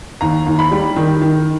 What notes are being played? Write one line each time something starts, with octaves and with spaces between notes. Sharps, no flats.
D#2 A#5
D#2
B5
G3
D#3
D#3